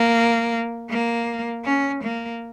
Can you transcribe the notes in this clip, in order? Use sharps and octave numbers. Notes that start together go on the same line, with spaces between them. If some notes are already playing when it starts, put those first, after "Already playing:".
Already playing: A#3
A#3
C#4
A#3